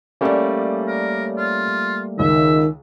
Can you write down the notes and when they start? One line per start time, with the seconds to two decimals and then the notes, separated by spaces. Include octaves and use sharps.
0.21 G3 A3 A#3 C#4 C#5 D5
0.88 A#4
1.38 F4
2.19 C#2 D#3 E5